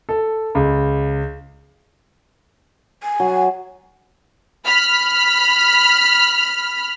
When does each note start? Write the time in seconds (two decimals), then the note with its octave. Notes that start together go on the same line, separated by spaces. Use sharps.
0.09 A4
0.55 C#2
3.03 G#5
3.20 F#3
4.65 B5 F6 B6